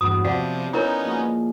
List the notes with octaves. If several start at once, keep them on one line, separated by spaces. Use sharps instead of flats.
E2 G2 F#3 B3 B5 D#6
C3 F3 D5 F5 F#5
B3 C#4 D#4 E4 A#4 C#5
A#2 F3 G#3